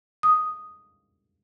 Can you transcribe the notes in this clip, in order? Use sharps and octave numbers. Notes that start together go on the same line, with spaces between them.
D#6